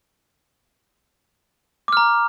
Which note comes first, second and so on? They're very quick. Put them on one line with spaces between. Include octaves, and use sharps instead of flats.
D6 F6 A#5